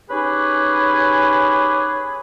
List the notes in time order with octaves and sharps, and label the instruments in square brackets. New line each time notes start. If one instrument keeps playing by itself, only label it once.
[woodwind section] C#4 D#4 G4 G#4 B4